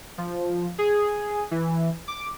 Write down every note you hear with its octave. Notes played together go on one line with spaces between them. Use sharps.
F3
G#4
E3
D6